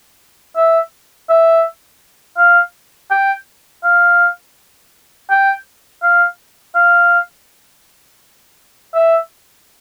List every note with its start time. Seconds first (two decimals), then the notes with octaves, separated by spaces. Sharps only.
0.57 E5
1.29 E5
2.38 F5
3.11 G5
3.84 F5
5.30 G5
6.03 F5
6.75 F5
8.94 E5